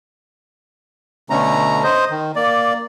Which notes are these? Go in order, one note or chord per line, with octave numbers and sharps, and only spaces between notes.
B2 D3 A3 C#4 A#5
C5 D#5
D#3
A#3 D5